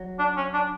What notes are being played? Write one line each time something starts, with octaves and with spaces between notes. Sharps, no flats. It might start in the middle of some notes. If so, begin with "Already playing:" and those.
Already playing: F#3
D4
C#4
D4